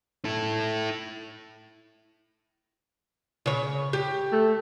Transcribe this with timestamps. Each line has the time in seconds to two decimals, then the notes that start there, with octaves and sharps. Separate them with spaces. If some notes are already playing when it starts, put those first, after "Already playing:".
0.25 E4 A4
3.46 C#3 C#5
3.93 G4
4.32 A3